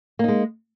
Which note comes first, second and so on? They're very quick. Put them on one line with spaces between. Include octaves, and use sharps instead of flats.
A#3 D#4 G#3